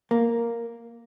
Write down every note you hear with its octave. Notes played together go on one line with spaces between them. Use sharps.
A#3